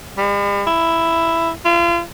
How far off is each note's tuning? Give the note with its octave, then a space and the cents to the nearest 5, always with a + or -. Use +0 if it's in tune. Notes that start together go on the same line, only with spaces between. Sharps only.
G3 +45
E4 +5
F4 -35